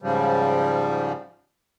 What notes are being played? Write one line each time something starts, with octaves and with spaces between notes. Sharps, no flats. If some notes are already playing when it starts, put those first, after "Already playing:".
G#2 C#3 F3 G3